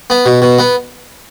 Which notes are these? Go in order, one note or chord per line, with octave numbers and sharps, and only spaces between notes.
B3
B2
B2
B3